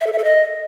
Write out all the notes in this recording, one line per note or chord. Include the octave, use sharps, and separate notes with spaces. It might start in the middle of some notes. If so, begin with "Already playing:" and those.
E5
A4
E5
A4
D#5